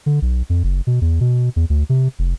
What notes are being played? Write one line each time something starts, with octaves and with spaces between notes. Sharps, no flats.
D3
B1
F2
F#1
B2
E2
B2
E2
D2
C3
F1